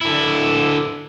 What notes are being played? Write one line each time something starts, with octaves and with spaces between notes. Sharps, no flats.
D3 E4